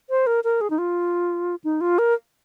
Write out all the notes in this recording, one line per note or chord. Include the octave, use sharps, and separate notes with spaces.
C5
A#4
A#4
G#4
D#4
F4
D#4
F4
A#4